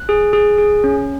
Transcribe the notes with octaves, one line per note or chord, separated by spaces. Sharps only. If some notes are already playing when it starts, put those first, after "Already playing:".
Already playing: F#6
G#4
G#4
G#4
C#4